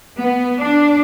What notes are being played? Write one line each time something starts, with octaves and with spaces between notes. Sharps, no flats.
B3
D4